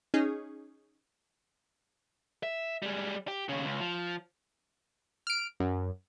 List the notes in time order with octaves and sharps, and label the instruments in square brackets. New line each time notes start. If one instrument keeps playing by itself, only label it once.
[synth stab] C#4 D#4 G#4
[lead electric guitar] E5
G3 G#3
G4
D#2 C#3
C#2
F3
[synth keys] F6 D7
F#2